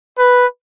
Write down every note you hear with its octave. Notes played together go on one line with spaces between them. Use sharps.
B4